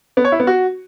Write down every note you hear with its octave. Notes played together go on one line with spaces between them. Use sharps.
B3
C#5
E4
B3
F#4